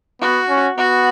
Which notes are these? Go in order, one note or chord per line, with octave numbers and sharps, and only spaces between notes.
B3 F#4
C#4
B3 F#4